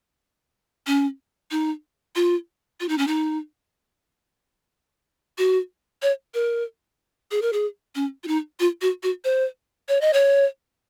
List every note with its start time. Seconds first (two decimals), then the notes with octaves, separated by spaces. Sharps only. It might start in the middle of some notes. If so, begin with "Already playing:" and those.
0.87 C#4
1.51 D#4
2.15 F4
2.80 F4
2.88 D#4
2.98 C#4
3.07 D#4
5.38 F#4
6.02 C#5
6.34 A#4
7.31 G#4
7.42 A#4
7.53 G#4
7.95 C#4
8.23 F4
8.27 D#4
8.60 F4
8.81 F#4
9.03 F#4
9.24 C5
9.88 C#5
10.01 D#5
10.13 C#5